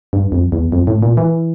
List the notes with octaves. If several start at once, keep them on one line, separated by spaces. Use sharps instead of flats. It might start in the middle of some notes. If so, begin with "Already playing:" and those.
G2
F2
E2
F2
A2
A#2
E3